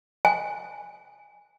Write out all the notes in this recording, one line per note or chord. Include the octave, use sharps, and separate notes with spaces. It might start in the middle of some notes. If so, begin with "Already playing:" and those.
G#5